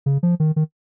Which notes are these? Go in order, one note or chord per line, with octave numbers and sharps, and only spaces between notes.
C#3
F3
D#3
D#3